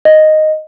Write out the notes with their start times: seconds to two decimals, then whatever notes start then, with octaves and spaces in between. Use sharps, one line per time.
0.05 D#5